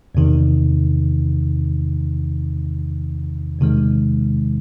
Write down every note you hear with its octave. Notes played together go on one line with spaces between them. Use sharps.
E2 C3 D#3
E2 C3 D#3 G#3